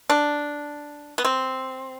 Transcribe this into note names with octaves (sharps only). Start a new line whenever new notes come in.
D4
B3
C4